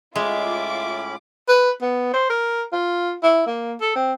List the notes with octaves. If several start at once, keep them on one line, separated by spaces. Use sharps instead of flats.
A2 G#3 C#4 F4 E5 B5 D6
B4
B3
C5
A#4
F4
E4
A#3
A4
C4